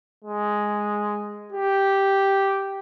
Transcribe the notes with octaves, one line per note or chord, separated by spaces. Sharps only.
G#3
G4